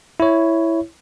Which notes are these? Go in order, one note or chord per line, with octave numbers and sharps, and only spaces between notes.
E4 C#5